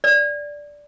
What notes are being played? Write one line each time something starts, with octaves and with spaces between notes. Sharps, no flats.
D5